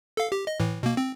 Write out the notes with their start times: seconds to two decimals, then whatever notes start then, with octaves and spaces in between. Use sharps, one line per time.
0.17 A4 F5
0.32 G4
0.47 D#5
0.60 A2 E3
0.83 B2 A#3
0.97 C4